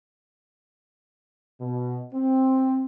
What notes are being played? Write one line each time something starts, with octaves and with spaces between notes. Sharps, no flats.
B2
C4